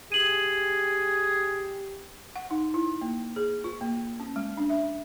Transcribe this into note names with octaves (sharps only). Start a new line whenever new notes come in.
G4 G#4 D#7 F#7
F#5
D#4
E4
A#3
G#4
F4
A#3
C#4
G#3
D4
E5